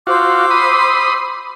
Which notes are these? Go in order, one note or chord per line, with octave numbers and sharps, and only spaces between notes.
F4 F#4 C5 D6 E6
B5 C6 D#6